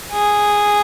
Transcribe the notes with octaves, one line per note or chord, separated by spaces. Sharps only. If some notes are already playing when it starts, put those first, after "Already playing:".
G#4